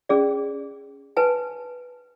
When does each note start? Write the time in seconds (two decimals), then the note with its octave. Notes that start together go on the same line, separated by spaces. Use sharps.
0.09 C#4 G#4 D5
1.17 B4 G#5 A5